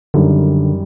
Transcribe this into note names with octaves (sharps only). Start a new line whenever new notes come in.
F#2 D3 D#3 G3